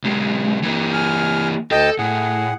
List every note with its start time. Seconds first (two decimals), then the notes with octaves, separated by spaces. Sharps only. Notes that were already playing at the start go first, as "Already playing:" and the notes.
0.04 B1 G#3
0.63 E3 A#3
0.93 G#5 F6
1.71 D2 A4 D#5 G5
1.99 A2 G#4 F#5